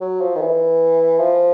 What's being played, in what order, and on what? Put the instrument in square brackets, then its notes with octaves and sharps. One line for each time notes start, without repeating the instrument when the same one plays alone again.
[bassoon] F#3
F3
D#3
E3
F3